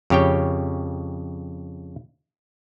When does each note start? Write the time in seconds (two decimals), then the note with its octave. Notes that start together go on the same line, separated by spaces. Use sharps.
0.10 F2 C#3 G4 C#5 G5